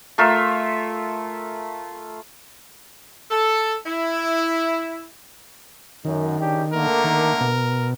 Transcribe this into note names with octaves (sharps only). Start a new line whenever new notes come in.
A3 F4 A#4 E5
A4
E4
F#2 D#3
C#3 D4 G4
D3 A3 A#3 A#4
D#3
B2